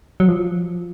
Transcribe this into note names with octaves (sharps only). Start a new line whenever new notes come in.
F#3
F3